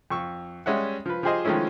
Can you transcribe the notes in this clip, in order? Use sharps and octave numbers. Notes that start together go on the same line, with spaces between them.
F2 C#6 E6
G3 G#3 C#4 E5 F#5
F3 B4
F3 G4 G#4 C5 D#5
D#3 F3 G#3 A3 C#4 E4